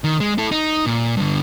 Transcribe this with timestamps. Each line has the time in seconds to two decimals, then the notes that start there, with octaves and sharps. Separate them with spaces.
0.04 D#3
0.20 G#3
0.38 E4 A4
0.51 D#4
0.86 A#2
1.17 G2 D3